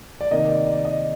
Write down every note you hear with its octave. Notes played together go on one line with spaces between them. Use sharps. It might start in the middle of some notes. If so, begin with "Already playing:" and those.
D5
C3 D#3 A#3 D#4 D#5
D5
D5
D#5